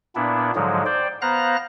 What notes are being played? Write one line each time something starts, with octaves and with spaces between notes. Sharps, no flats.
A#2 B3 D4 E4
G#2 D3 F3 F#3 G#3
C5 D5 G5
B3 C5 F5 A#5 F#6 A#6